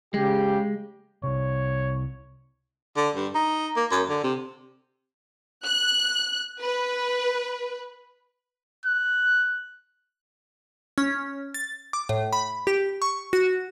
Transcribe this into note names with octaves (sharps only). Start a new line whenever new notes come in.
C#3 G#3 G4
C2 C3 C#5
D3
G2
D#4
A#3
F#2
D3
C3
F#6
B4
F#6
C#4
A6
D6
A2
B5
G4
C#6
F#4